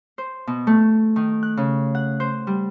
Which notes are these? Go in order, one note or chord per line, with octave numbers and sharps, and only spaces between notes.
C5
B2
A3
D#3
F#6
C#3
F#5
C5
G3